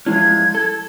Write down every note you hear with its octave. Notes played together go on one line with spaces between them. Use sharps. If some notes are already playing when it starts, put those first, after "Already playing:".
F3 G#3 C#4 E4 G#6
A4